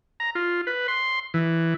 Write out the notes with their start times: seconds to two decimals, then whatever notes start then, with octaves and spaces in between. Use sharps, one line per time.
0.20 A#5
0.35 F4
0.67 B4
0.88 C6
1.34 E3